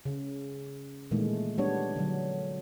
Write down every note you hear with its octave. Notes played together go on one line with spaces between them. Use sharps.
C#3
A#2 D#3 E3 G#3 A3
G3 B3 D4 C#5
D3 F#3